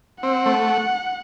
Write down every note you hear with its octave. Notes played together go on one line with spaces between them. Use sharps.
C4 F#5
A3